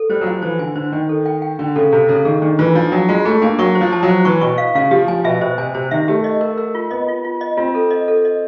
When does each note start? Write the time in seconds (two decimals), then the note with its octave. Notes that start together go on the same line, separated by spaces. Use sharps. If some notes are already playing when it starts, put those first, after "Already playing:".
Already playing: A4
0.09 G3 C5
0.21 F#3
0.26 F3 C5
0.42 E3 C5
0.59 D3 G#5
0.75 D3 C5
0.92 D#3 G5
1.09 A4
1.26 G5
1.42 G5
1.59 D3 G5
1.76 C#3 A4
1.92 C3 A4
2.08 C#3 A4
2.25 D#3 G#4
2.42 D#3 D4
2.59 E3 F4
2.75 F3 D4
2.92 F#3 D4
3.09 G#3 F4
3.25 A3 G#4
3.41 A#3 D4
3.59 F#3 C#6
3.75 C5
3.81 F3
3.92 A5
4.03 F#3
4.09 C5
4.25 E3 C#6
4.41 B2 C#6
4.58 F5
4.75 C#3 F5
4.91 F3 G4
5.08 F3 G#5
5.24 B2 E5
5.41 B2 C5
5.58 C3 G#5
5.74 C3 C5
5.91 D#3 E5
6.08 A3 G4
6.24 D#5
6.41 A#4
6.58 A#4
6.75 F4
6.91 B3 D#5
7.08 F4
7.24 F4
7.41 D#5
7.57 C4 F4
7.75 A4
7.90 D#5
8.08 A4
8.25 D#5